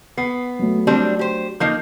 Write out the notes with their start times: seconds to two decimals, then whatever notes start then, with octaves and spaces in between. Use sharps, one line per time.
0.18 B3 C7
0.59 F#3 A3
0.87 G3 C4 D4
1.19 G4 C5
1.60 F3 A#3 D#4 G6 C7